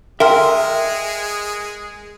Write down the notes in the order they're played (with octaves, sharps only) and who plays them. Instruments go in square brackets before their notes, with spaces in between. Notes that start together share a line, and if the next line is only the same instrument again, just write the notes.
[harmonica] G#3 G#4 [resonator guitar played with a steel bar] A#4 [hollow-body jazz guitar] E5 [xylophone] G5 C6 F6